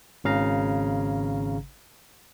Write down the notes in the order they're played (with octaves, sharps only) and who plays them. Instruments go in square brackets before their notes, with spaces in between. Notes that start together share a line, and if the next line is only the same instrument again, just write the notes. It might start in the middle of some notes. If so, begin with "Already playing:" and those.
[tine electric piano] G#1 C#3 F5 A#5